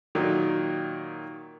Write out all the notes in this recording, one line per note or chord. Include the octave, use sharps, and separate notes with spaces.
A#2 D#3 F#3